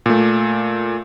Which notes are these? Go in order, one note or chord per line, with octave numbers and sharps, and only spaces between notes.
A#2 A3